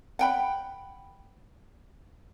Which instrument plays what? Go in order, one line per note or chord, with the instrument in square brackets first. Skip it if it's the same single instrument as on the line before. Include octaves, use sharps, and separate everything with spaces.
[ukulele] F#5 G5 B5